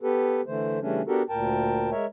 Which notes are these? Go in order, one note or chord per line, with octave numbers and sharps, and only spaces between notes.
B3 G4 A4 B4
D3 E3 A3 C5
C#3 E3 G3 A3 C#4 D4
B3 D4 F#4 G4 A4 A#4
D2 A#2 A#4 G5 A5
G#3 A#4 C#5 E5